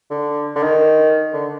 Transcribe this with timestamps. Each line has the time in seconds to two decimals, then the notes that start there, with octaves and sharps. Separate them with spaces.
0.10 D3
0.56 D3
0.63 D#3
1.33 D3